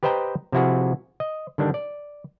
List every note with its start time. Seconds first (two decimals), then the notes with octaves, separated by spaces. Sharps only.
0.03 G4 B4 C5 D#5 G5 A#5
0.52 C3 F3 E4 F#4 G#4
1.20 D#5
1.58 D3 D#3 G3 D4
1.74 D5